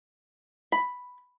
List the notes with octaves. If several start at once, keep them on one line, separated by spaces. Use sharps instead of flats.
B5